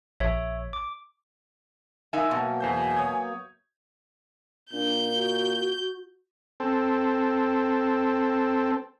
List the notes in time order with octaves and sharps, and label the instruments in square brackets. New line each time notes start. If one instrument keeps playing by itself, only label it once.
[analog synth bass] A#1 [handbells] C#5 E5
[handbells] D6
[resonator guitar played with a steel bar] D#4 E5 [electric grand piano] A#4 F#5 G#5
[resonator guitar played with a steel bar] B2 [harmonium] F#3 A#3 B3
[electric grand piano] E2 C5 G6 [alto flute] G#5
[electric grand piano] C#5 D#6 G#6
[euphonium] A#2 [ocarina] D4 [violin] G6
[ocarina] F#4
[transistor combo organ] C4 A4